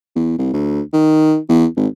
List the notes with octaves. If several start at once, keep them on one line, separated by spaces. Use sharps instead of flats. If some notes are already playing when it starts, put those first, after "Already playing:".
E2
C2
D2
D#3
E2
G#1